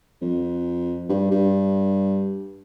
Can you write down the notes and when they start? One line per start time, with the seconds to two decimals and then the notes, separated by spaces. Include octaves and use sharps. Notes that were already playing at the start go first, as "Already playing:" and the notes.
0.21 F2
1.09 G2
1.31 G2